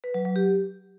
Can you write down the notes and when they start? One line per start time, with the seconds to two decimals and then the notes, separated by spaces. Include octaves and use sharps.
0.04 B4
0.14 F#3
0.25 F#3
0.36 G4